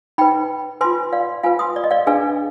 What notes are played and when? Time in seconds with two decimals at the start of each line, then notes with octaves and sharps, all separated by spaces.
0.18 D#4 B4 G5 B5
0.81 F4 B4 G#5 C6
1.13 D5 F5
1.44 F4 B4 F5 G#5
1.59 C6 D#6
1.76 D5
1.84 D#5
1.91 D5 F5
2.07 D4 G#4 B4 F5 G#5